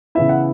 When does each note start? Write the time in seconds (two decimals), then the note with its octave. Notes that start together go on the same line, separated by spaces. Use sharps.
0.15 C#3 E3 B3 E4 E5
0.29 F#5